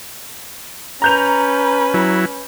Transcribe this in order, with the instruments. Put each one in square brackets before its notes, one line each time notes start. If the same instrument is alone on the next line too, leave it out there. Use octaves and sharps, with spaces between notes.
[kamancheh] C#4 B4 [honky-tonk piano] A#5 G6 F7
[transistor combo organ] F#3 E4